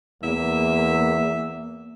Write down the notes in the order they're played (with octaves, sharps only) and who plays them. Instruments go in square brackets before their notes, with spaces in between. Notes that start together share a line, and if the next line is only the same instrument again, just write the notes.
[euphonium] E2 [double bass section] A#3 [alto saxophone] E5